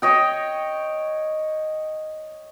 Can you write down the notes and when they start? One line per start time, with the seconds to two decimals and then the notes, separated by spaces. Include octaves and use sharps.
0.02 C#5 D#5 G5